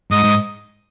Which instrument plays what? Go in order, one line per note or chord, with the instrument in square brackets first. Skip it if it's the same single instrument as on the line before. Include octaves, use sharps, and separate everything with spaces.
[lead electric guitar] G#2 [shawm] D#5
[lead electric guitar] G#2